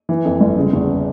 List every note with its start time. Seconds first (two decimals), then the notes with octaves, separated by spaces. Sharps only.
0.09 E3
0.25 F2
0.40 G1
0.56 C#3
0.73 E2